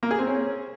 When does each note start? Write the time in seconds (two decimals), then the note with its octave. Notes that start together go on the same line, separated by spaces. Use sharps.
0.03 A#3
0.11 G#4
0.19 C4
0.27 C#4